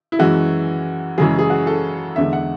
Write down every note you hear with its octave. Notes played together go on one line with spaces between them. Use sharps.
E4
F#2 E3 G#3 F#4
F#2 C#3 E3 G#3 G#4
G#4
F#4
A4
E2 D3 G#3 E5
F#5